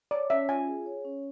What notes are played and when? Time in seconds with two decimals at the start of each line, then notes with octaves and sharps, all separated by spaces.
0.11 C#5 D5
0.30 C#4 E5
0.48 F4 G#5
0.67 G#4
0.86 C#5
1.05 C#4